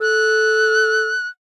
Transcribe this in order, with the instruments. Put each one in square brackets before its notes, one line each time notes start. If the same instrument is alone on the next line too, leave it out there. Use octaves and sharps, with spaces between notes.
[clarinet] A4 [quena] F#6